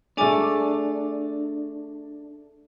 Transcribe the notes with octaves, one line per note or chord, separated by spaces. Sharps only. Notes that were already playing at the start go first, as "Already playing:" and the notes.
A3 D4 G#4 D5 G#5 D6